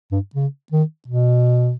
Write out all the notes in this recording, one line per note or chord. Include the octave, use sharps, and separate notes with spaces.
G2
C#3
D#3
B2